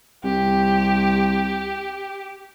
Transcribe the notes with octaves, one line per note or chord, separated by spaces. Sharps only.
C2 G4